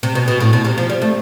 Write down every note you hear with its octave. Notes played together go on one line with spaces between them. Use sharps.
C3
B2
B2
A2
B2
C3
F3
G3
A3